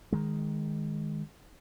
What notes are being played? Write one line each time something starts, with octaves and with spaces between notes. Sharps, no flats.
D#3 G#3